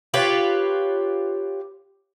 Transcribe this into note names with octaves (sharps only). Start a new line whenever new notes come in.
F4 G4 B4 C#5